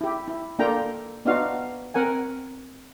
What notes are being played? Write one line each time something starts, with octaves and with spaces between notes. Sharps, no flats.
E4 G4
E4
A#3 D4 F4 A4 G5 A#5
B3 D4 D#4 F4 F#4 F5
C4 A#4 F#5 G#5